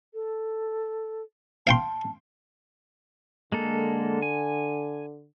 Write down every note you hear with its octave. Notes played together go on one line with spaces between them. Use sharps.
A4
F5 G5 A5 C6
D3 G#3 A#3 A4
G#5